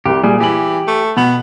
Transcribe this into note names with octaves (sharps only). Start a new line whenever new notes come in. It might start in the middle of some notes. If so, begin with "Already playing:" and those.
C2 G3 G4
A#2 G3 G#4 G#5
E3 G4 G#5 F#7
A3
B2 B3 F#7